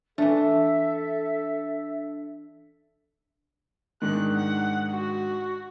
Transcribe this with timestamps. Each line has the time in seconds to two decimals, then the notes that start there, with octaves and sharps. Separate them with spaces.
0.18 E3 A3 D4 A4 E5
4.02 G#2 D#3 D4 F#6
4.36 F#5
4.91 F#4